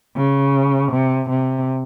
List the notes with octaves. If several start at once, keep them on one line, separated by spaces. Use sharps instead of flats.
C#3
C3
C3